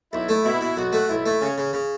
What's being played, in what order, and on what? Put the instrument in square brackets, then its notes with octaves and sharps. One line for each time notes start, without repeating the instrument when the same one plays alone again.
[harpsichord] B1 [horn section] E4
[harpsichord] A3
[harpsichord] B2 [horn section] E4
[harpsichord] B2
[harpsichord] B1 [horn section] F#4
[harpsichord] A3
[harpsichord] B1 [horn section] E4
[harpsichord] A3
[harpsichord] C#3 [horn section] C#4
[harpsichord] C#3
C#3